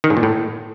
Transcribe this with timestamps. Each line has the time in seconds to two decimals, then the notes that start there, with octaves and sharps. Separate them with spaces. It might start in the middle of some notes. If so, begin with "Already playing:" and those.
0.04 D#3
0.10 G#2
0.17 A#2
0.23 A2